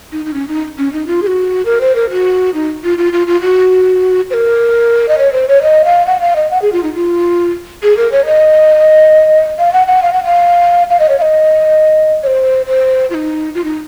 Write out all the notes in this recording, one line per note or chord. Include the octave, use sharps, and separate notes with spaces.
D#4
D#4
C#4
D#4
C#4
D#4
F4
G#4
F#4
A#4
C5
A#4
F#4
D#4
F4
F4
F4
F4
F#4
C5
A#4
D#5
C#5
C5
C#5
D#5
F5
F#5
F5
D#5
F#5
G#4
F4
D#4
F4
G#4
A#4
C#5
D#5
F5
F#5
F#5
F5
F#5
F5
F5
D#5
C#5
F5
D#5
C#5
C5
C5
F4
D#4
F4
D#4